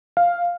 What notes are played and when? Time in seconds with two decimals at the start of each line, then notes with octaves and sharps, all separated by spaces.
0.17 F5